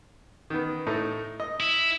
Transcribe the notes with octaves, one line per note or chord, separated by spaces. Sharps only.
D#3 B3
A2 A3 D#4
D#5
E4